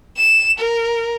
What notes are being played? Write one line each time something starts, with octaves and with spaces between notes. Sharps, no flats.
E7
A#4